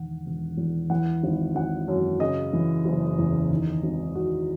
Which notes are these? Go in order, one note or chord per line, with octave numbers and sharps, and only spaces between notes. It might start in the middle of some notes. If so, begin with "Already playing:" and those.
Already playing: E1 D#3 F#5
E1
E2
E3 F#5
G#1
G#1 F#5
F#2
C#3 D#5
E3
F#1
E2
D#3
G#1
G#1 F#4